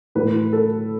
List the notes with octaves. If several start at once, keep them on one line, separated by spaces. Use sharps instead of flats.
A2 E3 A3 B4
A4